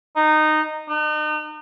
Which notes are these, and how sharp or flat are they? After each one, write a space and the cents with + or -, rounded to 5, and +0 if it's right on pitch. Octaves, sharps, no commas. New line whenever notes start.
D#4 -15
D#4 -40